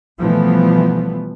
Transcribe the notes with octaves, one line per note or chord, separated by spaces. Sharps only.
B2 E3 F3 G3 A3 B3